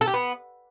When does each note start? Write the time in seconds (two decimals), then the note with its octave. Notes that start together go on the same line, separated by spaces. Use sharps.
0.01 A4
0.07 G4
0.14 B3